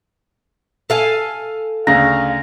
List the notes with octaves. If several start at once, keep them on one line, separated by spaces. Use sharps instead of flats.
A4 F5 G#5
D2 C#3 F5 A#5